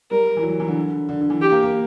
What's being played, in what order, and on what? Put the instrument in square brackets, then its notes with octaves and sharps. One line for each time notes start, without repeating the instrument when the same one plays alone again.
[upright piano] G3 [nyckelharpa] A#4
[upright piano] E3
F#3
E3
D3
D3
D3
E3
[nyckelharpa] G4
[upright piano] A#3
A#3